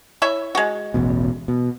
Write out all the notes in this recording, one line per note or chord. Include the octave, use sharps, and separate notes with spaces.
E4 C#5 E5
G#3 F#4
E1 A1 B2
B2